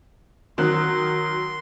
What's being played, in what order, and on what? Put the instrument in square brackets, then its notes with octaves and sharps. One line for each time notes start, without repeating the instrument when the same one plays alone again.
[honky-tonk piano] D#3 F#3 F#6 [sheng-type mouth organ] C6